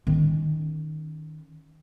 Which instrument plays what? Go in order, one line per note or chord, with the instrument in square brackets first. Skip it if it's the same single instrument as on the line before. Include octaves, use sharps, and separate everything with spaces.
[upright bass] D#3 C#4